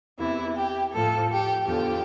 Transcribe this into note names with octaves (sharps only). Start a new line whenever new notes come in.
E2 C3 E3 E4
G4
A2 F3 A4
G4
E2 D3 F3 G4